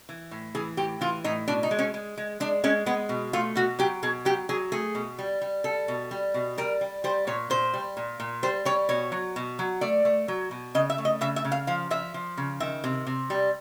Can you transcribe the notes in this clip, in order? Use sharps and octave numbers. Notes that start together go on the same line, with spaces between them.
E3
A2
E3 G#4
A2 G4
E3 F4
A2 D#4
B2 D4
D#4
G#3
C#4
G#3
G#3
G#3 D4
G#3 C#4
G#3 B3
B2
A3 F4
B2 F#4
F#3 G4
B2 G#4
F#3 G4
F#3 G#4
A3 G#4
B2
G3
G3
G3 A4
B2
G3
B2
G3 A#4
G3
G3 C5
A#2 C#5
A#2 C5
G3
A#2
A#2
G3 C5
G3 C#5
B2 C#5
F#3
B2
F#3
A3 D5
A3
F#3
B2
C#3 D#5
E5
A3
D#5
C#3 E5
E5
C#3
F5
F3 F5
F3 E5
F3
C#3
D#3 E5
C3
C3
G3